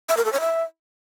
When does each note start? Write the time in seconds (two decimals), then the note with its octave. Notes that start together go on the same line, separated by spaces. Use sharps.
0.09 E5
0.17 A#4
0.25 A4
0.32 C#5
0.40 E5